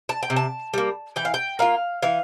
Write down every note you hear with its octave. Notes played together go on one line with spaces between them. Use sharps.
A5
G5
C3
A5
G3 A#3
E3 G5
F5
G5
A#3 F4 F5
E3 F5